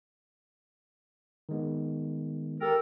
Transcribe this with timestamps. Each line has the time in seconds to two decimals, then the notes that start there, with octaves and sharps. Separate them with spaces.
1.49 D#3 G#3 B3
2.61 G4 A4 A#4